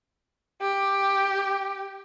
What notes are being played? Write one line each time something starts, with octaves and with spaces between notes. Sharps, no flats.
G4